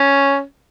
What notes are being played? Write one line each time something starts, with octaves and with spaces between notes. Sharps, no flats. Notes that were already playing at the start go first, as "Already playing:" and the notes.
Already playing: C#4